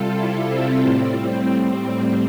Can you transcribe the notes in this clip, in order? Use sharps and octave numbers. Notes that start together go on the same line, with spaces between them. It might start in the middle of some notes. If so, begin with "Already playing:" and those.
Already playing: C3 G3 F4 A4
E4
C4
A2 G3